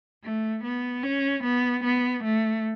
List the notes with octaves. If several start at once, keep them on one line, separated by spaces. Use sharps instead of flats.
A3
B3
C#4
B3
B3
A3